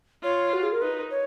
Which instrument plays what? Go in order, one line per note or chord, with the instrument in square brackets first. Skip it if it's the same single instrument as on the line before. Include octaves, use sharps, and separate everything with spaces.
[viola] F4 [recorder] C#5
[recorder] F#4
G#4
A#4
[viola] D#4 [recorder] B4
[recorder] C#5